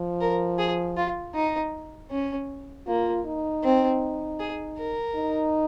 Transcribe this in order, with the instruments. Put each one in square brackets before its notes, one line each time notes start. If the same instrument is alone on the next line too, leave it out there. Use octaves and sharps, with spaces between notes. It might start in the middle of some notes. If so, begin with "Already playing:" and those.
Already playing: [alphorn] F3
[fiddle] A#4
G#4
F4
D#4
C#4
[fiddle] A#3 [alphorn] F4
[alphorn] D#4
[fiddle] C4
G#4
A#4
[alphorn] D#4